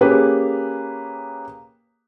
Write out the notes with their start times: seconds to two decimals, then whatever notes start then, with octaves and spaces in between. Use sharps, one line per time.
0.01 A#3 C#4 G4 G#4 B4